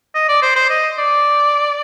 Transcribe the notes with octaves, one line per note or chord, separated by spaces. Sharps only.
D#5
D5
C5
C5
D#5
D5